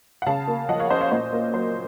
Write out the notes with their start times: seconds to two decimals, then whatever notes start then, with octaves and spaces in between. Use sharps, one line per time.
0.22 F#5
0.26 C#3 F5 A5
0.48 A#3
0.69 F3 D#5 F#5
0.79 C#5 F5
0.90 C#4 C5 D#5
1.01 C#5 F5
1.11 A#2 C5 D#5
1.33 A#3
1.54 F#3 C5